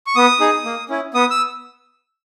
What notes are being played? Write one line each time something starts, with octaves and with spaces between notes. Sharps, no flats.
C#6
B3 D#6
D#4 G#4
A#3
C#4 E4
B3 D#6
E6